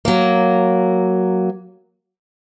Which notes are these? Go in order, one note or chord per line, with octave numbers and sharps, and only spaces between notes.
F#3 A#3